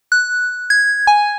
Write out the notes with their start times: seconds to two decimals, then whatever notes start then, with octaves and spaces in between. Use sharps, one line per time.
0.12 F#6
0.70 G#6
1.07 G#5